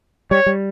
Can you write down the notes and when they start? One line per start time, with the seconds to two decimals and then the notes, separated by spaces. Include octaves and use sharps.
0.31 G3 C#5
0.46 G3